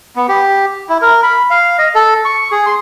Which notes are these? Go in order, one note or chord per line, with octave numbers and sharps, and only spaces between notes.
B3
G4
E4
A#4
B5
F5
D#5
A4
C#6
G#4
C6